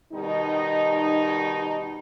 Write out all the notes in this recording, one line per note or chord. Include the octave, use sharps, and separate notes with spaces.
B2 D#3 G3 D#4